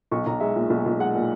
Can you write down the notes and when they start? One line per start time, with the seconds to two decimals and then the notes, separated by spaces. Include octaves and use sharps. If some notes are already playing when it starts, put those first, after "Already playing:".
0.12 B1 C#6
0.26 B1 A#5
0.41 G#3 E5
0.56 A#2
0.70 B1
0.86 B1
0.99 G#3 F#5
1.15 A#2